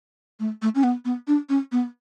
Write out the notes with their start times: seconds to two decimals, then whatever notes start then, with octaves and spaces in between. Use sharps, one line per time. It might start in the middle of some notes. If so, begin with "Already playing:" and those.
0.40 A3
0.62 A3
0.75 C#4
0.83 B3
1.05 B3
1.27 D4
1.49 C#4
1.72 B3